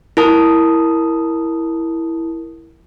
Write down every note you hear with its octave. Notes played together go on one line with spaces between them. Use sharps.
E4 A#4 A5 D#6